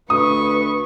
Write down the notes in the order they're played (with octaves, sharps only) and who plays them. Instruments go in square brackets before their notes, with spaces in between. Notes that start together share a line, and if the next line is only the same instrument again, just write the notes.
[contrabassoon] D2 [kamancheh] B4 C#6 [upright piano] D#6